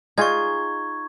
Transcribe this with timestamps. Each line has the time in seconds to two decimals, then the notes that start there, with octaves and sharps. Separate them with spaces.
0.18 D#4 F4 G#4 C#6 G#6